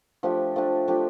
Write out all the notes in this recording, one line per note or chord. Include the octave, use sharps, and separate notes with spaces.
F3 A3 D4 G4
F3 A3 D4 G4
F3 A3 D4 G4